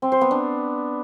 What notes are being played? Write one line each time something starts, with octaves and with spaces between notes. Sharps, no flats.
C4
C5
B3
D4